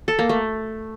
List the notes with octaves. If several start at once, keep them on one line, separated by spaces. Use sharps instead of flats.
A4
A#3
A3